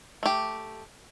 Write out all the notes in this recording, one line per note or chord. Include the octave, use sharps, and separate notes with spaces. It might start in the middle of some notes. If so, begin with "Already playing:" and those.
A3 G4